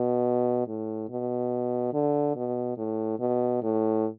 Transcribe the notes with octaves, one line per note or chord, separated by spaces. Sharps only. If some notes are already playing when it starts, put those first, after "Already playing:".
Already playing: B2
A2
B2
D3
B2
A2
B2
A2